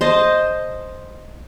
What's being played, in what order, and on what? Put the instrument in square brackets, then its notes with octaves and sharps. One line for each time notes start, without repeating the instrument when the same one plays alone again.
[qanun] C5 D#5 A5